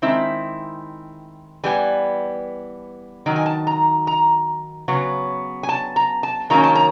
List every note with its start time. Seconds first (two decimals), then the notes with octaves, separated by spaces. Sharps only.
0.02 D#3 G#3 C4 E4 E5
1.64 E3 G3 B3 G#5
3.26 D#3 F#3
3.36 G#5
3.46 A5
3.67 A#5
4.07 A#5
4.88 C#3 F#3 B3
5.63 G#5
5.69 A5
5.96 A#5
6.23 A5
6.50 D#3 F#3 A#3 C#4 A#5
6.63 A5
6.75 A#5